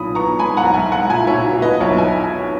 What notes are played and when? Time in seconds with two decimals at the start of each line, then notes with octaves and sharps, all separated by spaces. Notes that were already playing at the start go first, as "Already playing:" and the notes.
Already playing: B1 A#2 B5 D#6
0.15 B3 A#5 C#6
0.39 G#3 G#5 B5
0.57 F#5 A#5
0.63 B1
0.74 E5 G#5
0.86 G#3
0.92 F#5 A#5
1.09 A#2 E5 G#5
1.27 C#5 E5
1.33 A#2
1.44 F#4
1.56 A#2
1.62 B4 D#5
1.80 B1 C#5 E5
1.97 E5 G#5